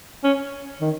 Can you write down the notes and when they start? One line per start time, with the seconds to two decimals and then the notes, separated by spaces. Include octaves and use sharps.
0.24 C#4
0.81 D#3